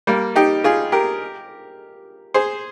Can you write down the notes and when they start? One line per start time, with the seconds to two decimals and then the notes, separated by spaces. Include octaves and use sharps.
0.07 G3 A#3
0.36 D#4 G4
0.64 F4 G#4
0.92 G4 A#4
2.34 G#4 C5